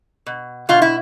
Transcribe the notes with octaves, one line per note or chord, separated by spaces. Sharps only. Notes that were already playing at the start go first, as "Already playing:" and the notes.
B2
B2 F4
E4